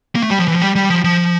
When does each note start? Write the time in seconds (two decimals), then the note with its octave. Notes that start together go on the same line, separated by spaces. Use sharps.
0.15 A#3
0.23 A3
0.31 G3
0.39 F3
0.48 E3
0.56 F3
0.62 G3
0.76 G3
0.90 F3
1.04 F3